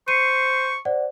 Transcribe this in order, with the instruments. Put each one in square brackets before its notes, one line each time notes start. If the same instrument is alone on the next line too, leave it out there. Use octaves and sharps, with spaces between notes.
[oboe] C5 [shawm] C#6 [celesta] C7 C#7 D#7
[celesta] C5 D5 F#5